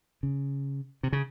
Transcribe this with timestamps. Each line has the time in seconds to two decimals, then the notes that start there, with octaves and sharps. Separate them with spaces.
0.23 C#3
1.03 C3
1.12 C#3